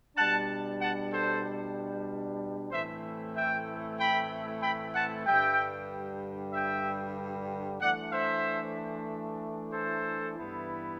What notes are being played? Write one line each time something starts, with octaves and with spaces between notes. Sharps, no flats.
B2 G3 D4 F#5 A5
F#5 A5
A4 C5
A2 E3 A3 C4 E4 C5 E5
E5 G5
G5 B5
G5 B5
F#5 A5
G2 D3 G3 E5 G5
E5 G5
E3 A3 D4 D5 F#5
C5 E5
A4 C5
G2 E3 B3 E4